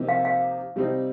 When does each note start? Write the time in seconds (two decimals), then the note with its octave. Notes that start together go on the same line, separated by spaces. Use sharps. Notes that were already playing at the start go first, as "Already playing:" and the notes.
Already playing: C3 F3 A#3 D#4 G4
0.09 F5
0.25 F5
0.76 C3 G3 C4 D#4